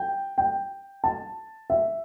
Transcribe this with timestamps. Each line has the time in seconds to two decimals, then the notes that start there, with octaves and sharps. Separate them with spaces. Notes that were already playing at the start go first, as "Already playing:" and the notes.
Already playing: G5
0.38 G5
1.04 A5
1.70 E5